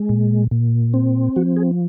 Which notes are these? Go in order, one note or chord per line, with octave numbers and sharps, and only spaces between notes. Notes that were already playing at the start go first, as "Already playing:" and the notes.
Already playing: G#3
A#2
A#2
C4
F3 F#4
G#4